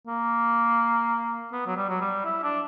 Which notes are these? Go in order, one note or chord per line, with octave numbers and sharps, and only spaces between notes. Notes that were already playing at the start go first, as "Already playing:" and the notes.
A#3
B3
F#3
G3
F#3
G3
E4
D4